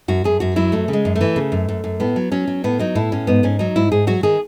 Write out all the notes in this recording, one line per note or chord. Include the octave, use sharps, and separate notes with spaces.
F#2 F#4
F#2 G#4
F#2 F#4
F#3 E4
F#2 A3
C#3
G#3
F#2
A3
E3
C#3
F#2
F#2
F#2
A2 B3
F#3
F#3 C#4
F#3
A2 B3
F#3 D#4
A2 E4
A2 C#4
G#2 B3
G#2 C#4
F#3 D#4
G#2 E4
G#2 G#4
F#3 F#4
D#3 G#4